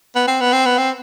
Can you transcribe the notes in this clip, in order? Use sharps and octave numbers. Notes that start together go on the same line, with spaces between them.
B3
C4
B3
C4
B3
C4